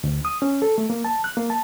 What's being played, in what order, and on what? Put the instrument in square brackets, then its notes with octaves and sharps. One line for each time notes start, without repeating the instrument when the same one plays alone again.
[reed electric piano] D2
D#6
C#4
A4
A3
A#3
A5
F#6
A#3
A5